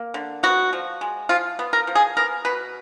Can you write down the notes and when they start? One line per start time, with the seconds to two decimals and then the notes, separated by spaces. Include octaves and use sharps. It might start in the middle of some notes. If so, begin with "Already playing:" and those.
Already playing: A#3
0.14 D3
0.43 B3 F#4
0.73 F3
1.01 G#3
1.29 F3 F4
1.59 B3
1.73 A#4
1.87 F3
1.95 G#4
2.17 B3 A#4
2.45 B2 B4